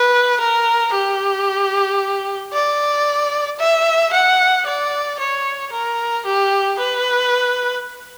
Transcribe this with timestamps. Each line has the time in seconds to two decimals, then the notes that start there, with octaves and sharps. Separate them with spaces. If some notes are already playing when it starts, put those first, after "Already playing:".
Already playing: B4
0.40 A#4
0.94 G4
2.54 D5
3.59 E5
4.12 F#5
4.66 D5
5.19 C#5
5.72 A#4
6.26 G4
6.79 B4